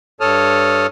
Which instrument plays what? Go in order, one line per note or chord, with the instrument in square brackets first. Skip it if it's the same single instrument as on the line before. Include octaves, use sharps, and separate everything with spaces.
[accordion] G2 A4 C#5 A5 D#6 F6